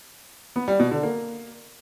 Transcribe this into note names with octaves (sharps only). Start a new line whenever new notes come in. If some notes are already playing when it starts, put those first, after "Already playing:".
B3
G3
B2
D3
A#3